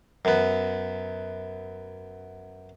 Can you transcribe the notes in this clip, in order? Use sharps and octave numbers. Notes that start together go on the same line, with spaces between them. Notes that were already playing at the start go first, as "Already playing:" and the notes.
F#2 B3